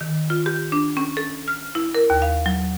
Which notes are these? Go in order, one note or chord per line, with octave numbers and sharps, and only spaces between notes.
D#3
F4
G4
D4
C#4
A4
F6
E4
A#4
D#2
F5
F#3